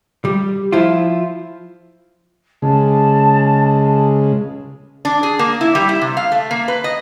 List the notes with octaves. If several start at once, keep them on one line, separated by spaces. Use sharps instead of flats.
G3
F3 E4 F4
C#3 G#3 A5
D4
G#4
A#3
E4
G3
E4
C3
F5
A3
A#3
B4
D#5